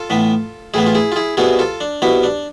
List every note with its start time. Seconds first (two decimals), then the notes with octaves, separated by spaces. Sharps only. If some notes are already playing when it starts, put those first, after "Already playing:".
Already playing: F4 A4
0.10 A2 E3 B3
0.74 A2 E3 B3 E4 G#4
0.86 F4
0.95 E4 G#4
1.12 F4
1.16 E4 G#4
1.37 C2 B2 B3 E4 G#4
1.59 F4 A4
1.81 D4
2.02 C2 B2 B3 E4
2.23 D4